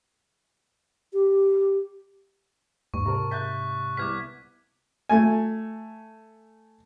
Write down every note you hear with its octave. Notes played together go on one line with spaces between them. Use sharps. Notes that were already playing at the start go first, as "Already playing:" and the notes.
G4
D#2 G#2 C#6
C3 A#4 A5 A#5
E5 F#6 G6 A6 B6
C2 B3 D6 F6 G#6 B6
A3 G#5